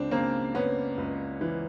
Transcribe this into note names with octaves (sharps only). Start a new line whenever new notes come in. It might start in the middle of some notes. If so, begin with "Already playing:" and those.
Already playing: C#2 C#3 C4 D4
C#3 A#3 C4
C#3 B3 C#4
C#2
E3